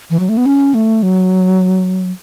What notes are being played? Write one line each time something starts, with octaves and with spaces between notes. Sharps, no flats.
E3
F#3
A3
B3
C#4
A3
F#3